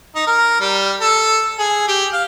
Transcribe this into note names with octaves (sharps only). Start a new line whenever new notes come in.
D#4
A#4
G3
A4
G#4
G4
F5